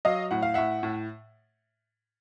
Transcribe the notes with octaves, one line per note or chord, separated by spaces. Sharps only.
F#3 D#5 F5
A2 F#5
F5
A2 E5 F#5
A2